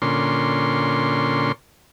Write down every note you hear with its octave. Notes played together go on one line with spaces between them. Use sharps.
A#2 D3 C#4 C6